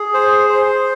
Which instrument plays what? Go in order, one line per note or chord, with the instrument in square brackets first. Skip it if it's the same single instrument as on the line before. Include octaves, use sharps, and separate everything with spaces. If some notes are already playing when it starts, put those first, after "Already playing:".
Already playing: [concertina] G#4
C5
C5